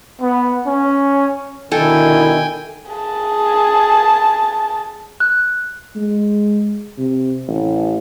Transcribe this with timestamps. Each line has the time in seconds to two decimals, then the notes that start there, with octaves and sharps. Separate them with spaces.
0.21 B3
0.67 C#4
1.72 B2 D3 D#3 E4 A4 G5 G#5
2.92 G#4 A5
5.20 F#6
5.96 G#3
6.98 C3
7.48 A1